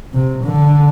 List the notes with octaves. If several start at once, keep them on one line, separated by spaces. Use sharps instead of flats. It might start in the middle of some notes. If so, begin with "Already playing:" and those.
C3
D3